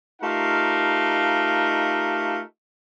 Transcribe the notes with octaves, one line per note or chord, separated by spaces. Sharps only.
A3 D#4 F4 G4 A#4 F5